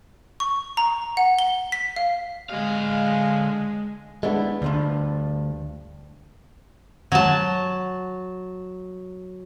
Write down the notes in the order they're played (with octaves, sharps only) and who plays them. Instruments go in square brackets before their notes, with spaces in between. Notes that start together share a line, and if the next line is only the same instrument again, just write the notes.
[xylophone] C#6
A#5
F#5
G7
B6
F5
[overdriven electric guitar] D3 F5 [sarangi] G#3
[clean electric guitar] G#3 B3 [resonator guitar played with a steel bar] A3 D4 E4
[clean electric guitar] D2 [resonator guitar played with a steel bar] G2 F3 D4
[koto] F#3 A5